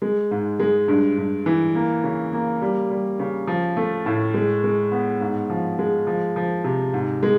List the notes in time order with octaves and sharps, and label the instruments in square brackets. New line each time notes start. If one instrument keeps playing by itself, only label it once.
[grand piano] G#3
G#2
G#3
G2
G2
E3
A#3
C#3
A#3
G3
G3
C#3
F3
A3
A2
G#3
G#3
B3
G#2
F3
G#3
F3
F3
C3
G#2
G#3